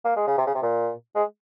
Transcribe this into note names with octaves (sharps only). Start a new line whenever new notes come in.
A#3
G#3
C#3
C3
C#3
C3
A#2
G#3